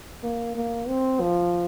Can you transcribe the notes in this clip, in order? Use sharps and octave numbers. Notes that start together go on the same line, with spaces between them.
A#3
A#3
C4
F3